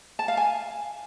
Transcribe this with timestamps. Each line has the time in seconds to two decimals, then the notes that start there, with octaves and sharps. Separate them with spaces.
0.19 A5
0.28 F5
0.37 G#5